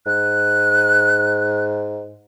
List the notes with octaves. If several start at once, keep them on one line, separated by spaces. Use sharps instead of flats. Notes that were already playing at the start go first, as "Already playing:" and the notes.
G#2 F#6